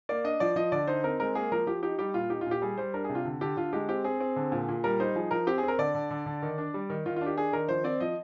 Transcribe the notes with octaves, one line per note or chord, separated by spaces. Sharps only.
A#3 D5
D4 D#5
F3 D5
F3 D#5
D3 D5
D#4 C5
C4 A#4
G#3 A#4
A#3 G#4
F3 A#4
F3 G4
D#4 G4
G3 G4
A#2 F4
D#4 G4
F4
A#2 G4
G3 G#4
G3 C5
D4 A#4
G#4
C3
F4
D3
D3 G4
D3 F4
G#3 G4
C4 G4
C4 G#4
C4
D3
A#2
A#2
G3 A#4
D#4 C5
F3 G#4
F3 A#4
C4 G4
G#4
C4
A#4
D3 D5
D3
D3
D3
D#3
D4
G3
D#3
D#3 F4
F4
D4
G4
D4 G#4
D#3 A#4
F3 C5
C4 D5
F3 D#5